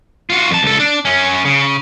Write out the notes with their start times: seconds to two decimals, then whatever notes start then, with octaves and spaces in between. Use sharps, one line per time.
0.30 F4 F#4
0.51 F2 A5
0.63 C#2 A4
0.80 D4
1.05 F#2 C#4
1.45 C#3